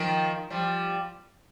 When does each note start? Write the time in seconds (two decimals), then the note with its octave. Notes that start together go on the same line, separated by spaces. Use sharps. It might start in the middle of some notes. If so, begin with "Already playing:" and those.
Already playing: D#3 F3
0.50 F3 G3